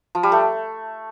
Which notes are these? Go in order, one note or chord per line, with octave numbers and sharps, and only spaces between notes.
F3
G3
A3